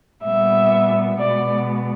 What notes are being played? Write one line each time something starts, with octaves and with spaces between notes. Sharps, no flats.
A#2 G3 B3 E5
B2 G#3 B3 D5